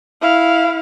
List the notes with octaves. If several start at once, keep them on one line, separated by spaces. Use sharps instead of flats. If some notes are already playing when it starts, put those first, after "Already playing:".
E4 F5